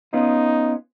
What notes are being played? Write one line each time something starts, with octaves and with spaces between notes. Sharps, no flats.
B3 C#4 D#4 F4